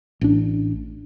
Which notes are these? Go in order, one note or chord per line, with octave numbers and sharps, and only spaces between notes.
A1 D4